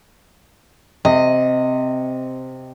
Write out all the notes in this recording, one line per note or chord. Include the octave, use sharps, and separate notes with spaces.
C3 D#5